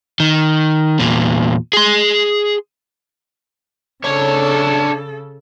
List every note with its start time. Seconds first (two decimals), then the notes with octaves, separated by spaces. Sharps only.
0.20 D#3
0.99 E2 A#2
1.73 G#4 C6
4.04 C#3 D4 A4 C#5